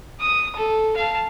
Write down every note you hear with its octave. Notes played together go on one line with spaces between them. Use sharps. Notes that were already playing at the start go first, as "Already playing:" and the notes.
D#6
A4
F5 A5